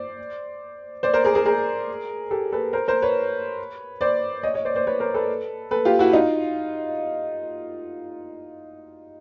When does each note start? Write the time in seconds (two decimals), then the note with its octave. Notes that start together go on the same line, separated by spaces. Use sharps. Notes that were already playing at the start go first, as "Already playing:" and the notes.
Already playing: C5 D5
1.03 C5 D5
1.14 A#4 C5
1.25 G#4 A#4
1.35 G#4 A#4
1.46 G#4 A#4
2.31 G4 A4
2.52 A4 B4
2.73 A#4 C5
2.88 A#4 C5
3.02 B4 C#5
4.01 C5 D5
4.43 C#5 D#5
4.54 C#5 D#5
4.65 C5 D5
4.75 C5 D5
4.87 B4 C#5
5.00 A#4 C5
5.14 A4 B4
5.71 A4 B4
5.85 F4 G4
5.99 E4 F#4
6.13 D#4 F4